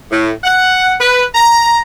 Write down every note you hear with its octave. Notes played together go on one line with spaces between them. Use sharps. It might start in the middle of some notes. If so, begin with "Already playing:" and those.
A2
F#5
B4
A#5